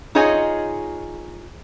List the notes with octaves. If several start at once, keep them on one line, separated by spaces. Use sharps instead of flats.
D#4 F4 G#4 C#5 D#5 G#5